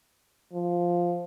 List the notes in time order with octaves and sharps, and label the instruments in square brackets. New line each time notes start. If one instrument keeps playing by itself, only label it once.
[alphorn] F3